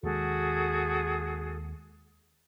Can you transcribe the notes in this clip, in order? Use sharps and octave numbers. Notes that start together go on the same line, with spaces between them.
D#2 G#3 F#4 G#4 A4